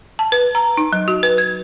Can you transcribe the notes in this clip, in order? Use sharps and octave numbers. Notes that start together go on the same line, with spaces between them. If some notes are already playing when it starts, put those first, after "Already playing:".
A5
B4
A#5
D#4
F#3
F#4
B4
G#6